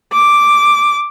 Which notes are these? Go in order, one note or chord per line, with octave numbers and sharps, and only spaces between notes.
D6